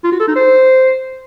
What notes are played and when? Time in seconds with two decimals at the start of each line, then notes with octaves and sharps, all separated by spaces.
0.04 F4
0.12 F#4
0.20 A4
0.28 D#4
0.36 C5